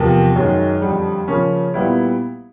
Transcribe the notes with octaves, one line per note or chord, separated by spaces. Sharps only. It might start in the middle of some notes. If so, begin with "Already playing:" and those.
Already playing: E2 C3 F3 A#3
F#2 D#3 G#3
F2 D3 G3
C#3 F3 A#3 C#4
A#2 G3 B3 E4